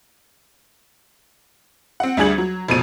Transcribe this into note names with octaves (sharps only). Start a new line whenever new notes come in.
C4 F#5
D2 G3 D4 G#4 G#6 F#7
F#3
F1 A#1 B2 D#7